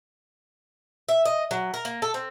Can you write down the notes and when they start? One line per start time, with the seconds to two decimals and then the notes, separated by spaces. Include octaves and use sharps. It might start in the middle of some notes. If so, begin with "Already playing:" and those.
1.09 E5
1.25 D#5
1.51 F#3
1.74 A#4
1.85 A#3
2.02 A4
2.14 C4